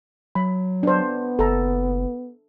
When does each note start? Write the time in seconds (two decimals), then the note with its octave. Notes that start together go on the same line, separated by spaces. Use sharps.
0.35 F#3 B5
0.83 B3 D4 C5
1.39 F#1 A4 A#5